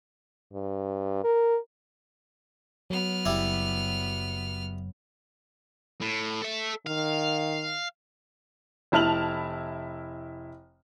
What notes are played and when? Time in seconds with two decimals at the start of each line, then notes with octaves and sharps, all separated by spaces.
0.54 G2
1.24 A#4
2.90 F#3 B3 F6
3.26 F#1 G3 E4
6.01 A2
6.42 A4 E5
6.86 D#3 F5
8.92 F1 E4 A5 F6 F7 F#7